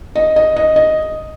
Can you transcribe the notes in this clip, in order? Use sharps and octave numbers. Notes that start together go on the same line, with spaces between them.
D#5
D#5
D#5
D#5